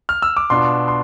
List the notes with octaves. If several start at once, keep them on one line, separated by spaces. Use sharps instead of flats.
F6
E6
D6
B2 B3 D4 F4 C6
C6